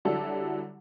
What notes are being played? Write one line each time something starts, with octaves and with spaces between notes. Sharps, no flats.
D3 F#3 G3 E4 A4